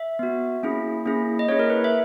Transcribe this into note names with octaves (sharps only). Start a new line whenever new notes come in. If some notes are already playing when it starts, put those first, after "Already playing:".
Already playing: E5
B3 F#4
A#3 C#4 E4 G#4
A#3 C#4 E4 G#4
D#5
A#3 C#4 E4 G#4 C#5
A#4
B4
E5